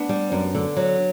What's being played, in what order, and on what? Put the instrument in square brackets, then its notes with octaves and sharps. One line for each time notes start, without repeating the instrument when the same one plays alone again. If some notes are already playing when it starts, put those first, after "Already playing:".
Already playing: [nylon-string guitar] B3 D4
G3
F#2
D3
F#3